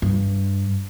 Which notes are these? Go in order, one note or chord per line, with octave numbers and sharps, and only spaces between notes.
G2